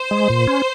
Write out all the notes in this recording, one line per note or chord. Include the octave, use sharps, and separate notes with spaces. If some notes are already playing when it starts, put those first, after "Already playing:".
Already playing: C5
G#3
A#2
C#4